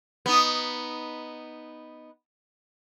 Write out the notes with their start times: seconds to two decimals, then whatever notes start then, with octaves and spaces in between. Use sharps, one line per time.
0.26 B3 D#4